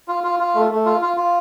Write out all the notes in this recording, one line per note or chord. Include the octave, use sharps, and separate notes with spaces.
F4
F4
F4
A3
A3
F4
F4
F4